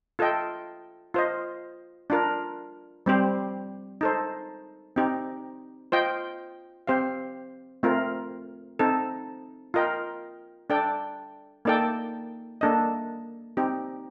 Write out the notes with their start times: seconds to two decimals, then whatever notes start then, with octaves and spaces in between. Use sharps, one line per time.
0.19 F4 A4 D#5 G5
1.14 F4 C5 D#5
2.10 D4 F4 A#4
3.06 G3 C4 G4 C5
4.01 D#4 A4 C5
4.96 C4 D#4 G4
5.92 F4 C5 D#5 G5
6.87 C4 G4 C5 F5
7.83 A3 C4 F4 A#4
8.79 C4 D#4 A4
9.74 F4 A#4 D#5 G5
10.70 D4 A4 D5 G5
11.65 A#3 D#4 A4 D5 G5
12.61 A#3 D4 A4 D#5
13.57 C4 D#4 G4